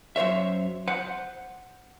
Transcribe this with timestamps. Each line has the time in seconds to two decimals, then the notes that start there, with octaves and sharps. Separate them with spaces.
0.16 F#2 C5 C#5 E5
0.88 C5 F#5